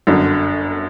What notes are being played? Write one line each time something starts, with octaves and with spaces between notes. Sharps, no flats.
G1 F#2 D3